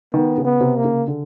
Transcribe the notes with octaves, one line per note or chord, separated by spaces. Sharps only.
D#3 B3
C#3
B3
C3
A#3
C#3
D3